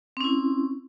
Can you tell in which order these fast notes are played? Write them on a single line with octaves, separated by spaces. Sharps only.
C4 C#4 E4